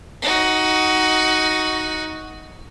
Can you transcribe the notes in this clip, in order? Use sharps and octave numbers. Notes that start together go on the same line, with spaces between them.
D#4 F#4